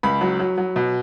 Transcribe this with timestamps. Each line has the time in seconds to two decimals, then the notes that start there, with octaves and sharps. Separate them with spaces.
0.03 C#2 B5
0.21 F#3
0.39 F#3
0.58 F#3
0.76 B2